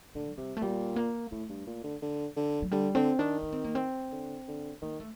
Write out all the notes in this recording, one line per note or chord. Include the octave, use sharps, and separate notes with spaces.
A2 D3
F#3
C3 G3
A3
A#2 G3
A#3
A2 A3
G2
A#2
D3
D3
D3
F#3
D3 G3
D3 C4
D#3 D4
D4
C4
A#3
C4
D3
D3
D#3 A#3
A3